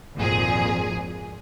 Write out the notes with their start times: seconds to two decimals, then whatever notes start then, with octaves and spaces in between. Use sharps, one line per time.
0.16 G#1 F2 A#2 G#4